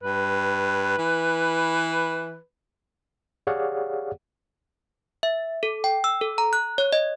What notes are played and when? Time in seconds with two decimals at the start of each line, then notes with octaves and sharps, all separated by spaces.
0.03 G2 B4
0.98 E3
3.47 G4 G#4 C#5 D5 F5 F#5
5.23 E5
5.63 A4
5.84 G5
6.04 E6
6.21 A4
6.38 A#5
6.53 F#6
6.78 C#5
6.93 D#5